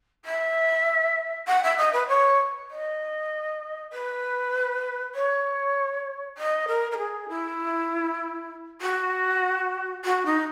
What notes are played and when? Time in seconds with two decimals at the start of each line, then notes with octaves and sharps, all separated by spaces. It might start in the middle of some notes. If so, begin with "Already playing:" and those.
0.25 E5
1.47 F#5
1.63 E5
1.77 D#5
1.92 B4
2.08 C#5
2.70 D#5
3.92 B4
5.14 C#5
6.37 D#5
6.67 A#4
6.91 A#4
6.97 G#4
7.28 E4
8.81 F#4
10.04 F#4
10.25 D#4